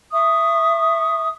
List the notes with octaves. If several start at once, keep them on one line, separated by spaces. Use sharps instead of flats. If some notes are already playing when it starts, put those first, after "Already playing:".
E5 C#6 D#6